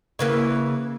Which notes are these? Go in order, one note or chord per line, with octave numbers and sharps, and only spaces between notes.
C#3 E3 A#3